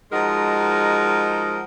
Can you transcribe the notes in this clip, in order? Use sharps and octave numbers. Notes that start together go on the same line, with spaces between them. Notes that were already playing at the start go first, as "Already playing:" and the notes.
F3 G#3 D#4 F#4 A#4